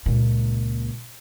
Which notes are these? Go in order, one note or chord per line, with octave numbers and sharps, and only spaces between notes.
C#2 A#2